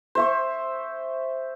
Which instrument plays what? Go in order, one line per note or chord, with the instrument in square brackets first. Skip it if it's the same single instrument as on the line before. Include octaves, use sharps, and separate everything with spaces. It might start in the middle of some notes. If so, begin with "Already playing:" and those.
[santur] C5 E5 C#6